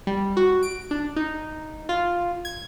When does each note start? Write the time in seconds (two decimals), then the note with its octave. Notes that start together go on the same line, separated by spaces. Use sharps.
0.07 G3
0.37 F#4
0.63 D7
0.91 D4
1.16 D#4
1.89 F4
2.45 G#6